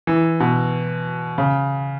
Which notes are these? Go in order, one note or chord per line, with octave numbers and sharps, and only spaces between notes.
E3
B2
C#3